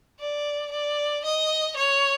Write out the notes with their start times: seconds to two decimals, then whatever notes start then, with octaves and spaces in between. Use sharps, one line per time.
0.20 D5
0.72 D5
1.24 D#5
1.77 C#5